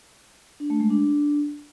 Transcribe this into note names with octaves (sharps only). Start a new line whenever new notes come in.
D4
A3
G#3
D4